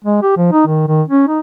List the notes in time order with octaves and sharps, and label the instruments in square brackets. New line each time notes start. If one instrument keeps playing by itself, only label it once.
[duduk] G#3
G4
F3
D#4
D#3
D#3
C#4
D#4